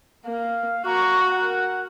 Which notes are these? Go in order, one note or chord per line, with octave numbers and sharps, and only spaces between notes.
A#3 F5
A#3 F#4 A#5 C#6
A#4 F#5